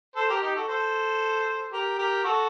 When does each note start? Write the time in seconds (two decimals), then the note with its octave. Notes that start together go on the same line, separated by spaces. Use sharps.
0.16 A4 C5
0.29 G4 A#4
0.42 D#4 G4
0.55 F#4 A4
0.69 A4 C5
1.72 G4 A#4
1.98 G4 A#4
2.24 F#4 A4